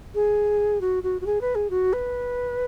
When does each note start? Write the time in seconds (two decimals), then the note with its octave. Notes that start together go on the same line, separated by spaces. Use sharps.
0.14 G#4
0.81 F#4
1.03 F#4
1.21 F#4
1.26 G#4
1.41 B4
1.55 G#4
1.70 F#4
1.93 B4